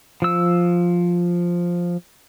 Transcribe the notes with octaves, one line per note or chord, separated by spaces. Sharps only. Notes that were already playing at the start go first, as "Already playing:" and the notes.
F3 E6